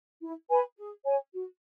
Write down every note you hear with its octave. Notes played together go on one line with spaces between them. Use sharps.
E4
B4 G#5 B5
G#4
C#5 G#5
F#4